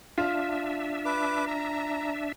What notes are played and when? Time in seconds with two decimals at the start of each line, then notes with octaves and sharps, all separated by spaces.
0.18 D4 F4 E5
1.05 B4 D6
1.48 A#5